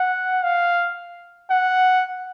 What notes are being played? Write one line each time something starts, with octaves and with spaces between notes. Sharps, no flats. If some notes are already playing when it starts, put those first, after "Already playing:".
Already playing: F#5
F5
F#5